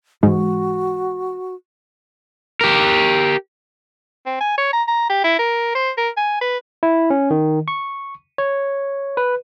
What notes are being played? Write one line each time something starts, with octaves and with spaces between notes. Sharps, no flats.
G#2 E3 G#3 F#4
G4 A#4
C4
G#5
C#5
A#5
A#5
G4
E4
A#4
C5
A#4
G#5
B4
E4
C#4
D#3
C#6
C#5
B4